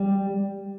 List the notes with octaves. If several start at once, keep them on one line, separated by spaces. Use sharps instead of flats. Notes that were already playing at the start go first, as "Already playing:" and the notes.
Already playing: G3